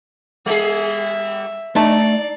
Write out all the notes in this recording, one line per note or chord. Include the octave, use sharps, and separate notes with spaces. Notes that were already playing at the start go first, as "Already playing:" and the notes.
G3 G#4 E5
A3 D4 D5 A5